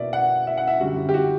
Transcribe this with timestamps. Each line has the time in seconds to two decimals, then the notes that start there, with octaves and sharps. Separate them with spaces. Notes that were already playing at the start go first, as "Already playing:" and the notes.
Already playing: B2 A#3 D5 E5
0.13 F#5
0.47 E5
0.58 F#5
0.68 E5
0.80 F#2 D3 G3 F#4
0.97 F#4
1.09 G4
1.14 F#4